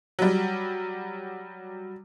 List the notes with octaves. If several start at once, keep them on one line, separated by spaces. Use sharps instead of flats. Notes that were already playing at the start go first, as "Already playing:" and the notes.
F#3 G3